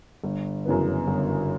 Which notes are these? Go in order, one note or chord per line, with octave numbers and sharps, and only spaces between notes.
G1
F#2 C#3 E3 B3
G1